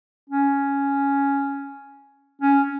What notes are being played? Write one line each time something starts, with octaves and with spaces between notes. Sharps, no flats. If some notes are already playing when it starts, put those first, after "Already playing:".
C#4
C#4